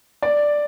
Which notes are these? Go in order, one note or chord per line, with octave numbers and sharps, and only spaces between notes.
D5